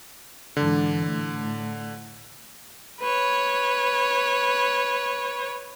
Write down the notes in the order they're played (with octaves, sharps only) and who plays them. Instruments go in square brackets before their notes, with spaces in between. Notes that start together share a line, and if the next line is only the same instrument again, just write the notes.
[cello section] G#2 E3 D4 [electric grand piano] D3
[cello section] A2 A3
[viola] B4 C#5